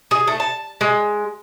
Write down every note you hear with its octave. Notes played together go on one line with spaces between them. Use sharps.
G#4
A3
A5
G#3